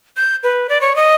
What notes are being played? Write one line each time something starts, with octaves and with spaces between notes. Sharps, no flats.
G6
B4
D5
C#5
D#5